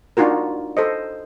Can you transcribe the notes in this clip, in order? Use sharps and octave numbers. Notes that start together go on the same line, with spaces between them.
D4 D#4 F4 F#4 A#4
A4 C5 D#5